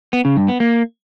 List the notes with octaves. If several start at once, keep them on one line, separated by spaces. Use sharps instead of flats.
B3
C#3
G2
B3
A#3